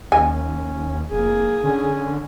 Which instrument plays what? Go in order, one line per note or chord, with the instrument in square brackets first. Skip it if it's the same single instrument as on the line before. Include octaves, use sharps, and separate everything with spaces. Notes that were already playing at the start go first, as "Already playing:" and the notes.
[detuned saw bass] D#2 [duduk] C#4 [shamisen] G#5
[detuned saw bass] F1 [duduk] A#3 [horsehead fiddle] G#4
[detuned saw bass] D3 [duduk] C#4